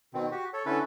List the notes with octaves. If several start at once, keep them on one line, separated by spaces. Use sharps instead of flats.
B2 D#3 C4
F#4 G4
A4 C#5
D3 C#4 E4 A4 B4